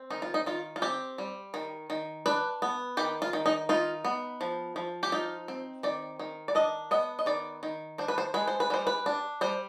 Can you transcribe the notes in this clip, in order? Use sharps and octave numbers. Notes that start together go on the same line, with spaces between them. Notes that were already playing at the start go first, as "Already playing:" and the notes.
Already playing: C4
D#3 D#4
F4
D#4
D#3 F4
F4
C4 G4
G3
D#3
D#3
D4 B4
B3
D#3 G4
F4
D#3
D#4
D#4 F4
B3
F3
F3
G4
D#4 F4
C4
D#3 D5
D#3
D5
D4 D#5
B3 D#5
D#5
D#3 D5
D#3
D4 C5
B4
C5
G#3 B4
C5
B4
G3 C5
B4
D4
G3 C5